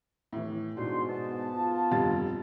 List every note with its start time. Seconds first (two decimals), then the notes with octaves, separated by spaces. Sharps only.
0.33 A2 E3
0.77 G#2 B2 D4 D#4 C6
1.08 B3 A5
1.56 F4
1.91 F1 G2 A6